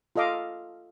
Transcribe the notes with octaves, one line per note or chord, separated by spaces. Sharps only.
F4 A4 D#5 F5 D6